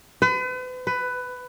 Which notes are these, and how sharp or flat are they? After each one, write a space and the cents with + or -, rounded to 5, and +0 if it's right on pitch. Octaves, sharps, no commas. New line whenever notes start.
B4 +40
B4 +15